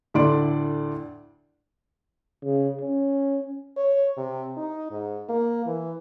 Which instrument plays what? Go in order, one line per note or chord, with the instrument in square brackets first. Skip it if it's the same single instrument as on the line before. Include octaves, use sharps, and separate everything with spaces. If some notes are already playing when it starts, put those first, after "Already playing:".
[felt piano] D2 A2 D4 D5 C6 D7
[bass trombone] C#3
C#4
[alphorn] C#5
C3
D#4
G#2
A#3
E3